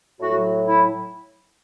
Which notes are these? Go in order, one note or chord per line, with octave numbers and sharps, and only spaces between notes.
A2 F#3 F#4
E4